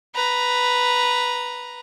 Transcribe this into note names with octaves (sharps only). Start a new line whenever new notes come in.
B4 A#5